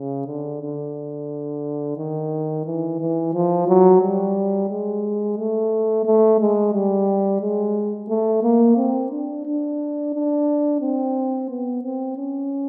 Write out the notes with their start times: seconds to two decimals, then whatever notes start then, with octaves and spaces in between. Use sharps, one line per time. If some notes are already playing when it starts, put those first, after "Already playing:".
Already playing: C#3
0.27 D3
0.62 D3
1.97 D#3
2.66 E3
3.00 E3
3.33 F3
3.68 F#3
4.02 G3
4.70 G#3
5.38 A3
6.05 A3
6.40 G#3
6.74 G3
7.42 G#3
8.09 A3
8.43 A#3
8.77 C4
9.11 D4
9.46 D4
10.14 D4
10.81 C4
11.49 B3
11.83 C4
12.17 C#4